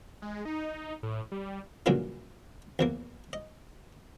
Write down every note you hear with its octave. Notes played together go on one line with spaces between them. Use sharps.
G#3
D#4
A2
G3
G2 A#2 C#3 E3 F#3 G#3
E2 E3 A#3
D#5